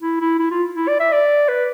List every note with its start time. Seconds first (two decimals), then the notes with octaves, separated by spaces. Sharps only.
0.02 E4
0.20 E4
0.39 E4
0.51 F4
0.76 E4
0.88 D5
1.00 E5
1.12 D5
1.49 B4